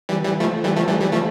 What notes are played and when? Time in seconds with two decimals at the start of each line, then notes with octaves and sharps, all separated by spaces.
0.09 E3 G3
0.24 E3 G3
0.40 F3 A3
0.64 E3 G3
0.76 F3 A3
0.88 E3 G3
1.01 E3 G3
1.12 F3 A3